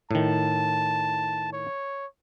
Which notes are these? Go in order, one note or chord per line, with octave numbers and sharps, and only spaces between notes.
A2 D#3 A5
C#5